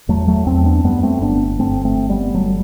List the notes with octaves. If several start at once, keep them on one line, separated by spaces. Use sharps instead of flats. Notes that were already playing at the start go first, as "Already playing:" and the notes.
E2 F#3 A3
F#3 A3
E2 A3 C4
B3 D4
F#2 G3 B3
A3 C4
G1 B3 D4
G1 A3 C4
A3 C4
G1
G3 B3
G1 F#3 A3